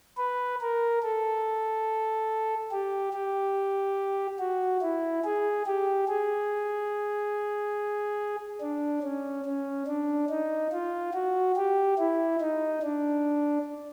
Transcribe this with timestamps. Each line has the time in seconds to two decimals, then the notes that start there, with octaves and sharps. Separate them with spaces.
0.18 B4
0.61 A#4
1.03 A4
2.71 G4
3.13 G4
4.40 F#4
4.82 E4
5.24 G#4
5.67 G4
6.08 G#4
8.61 D4
9.03 C#4
9.45 C#4
9.87 D4
10.30 D#4
10.72 F4
11.14 F#4
11.56 G4
11.99 E4
12.41 D#4
12.83 D4